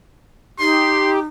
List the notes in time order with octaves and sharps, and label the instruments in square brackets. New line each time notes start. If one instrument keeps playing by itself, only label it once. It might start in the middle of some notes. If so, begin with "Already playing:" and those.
[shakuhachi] D#4 [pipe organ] G4 [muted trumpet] C6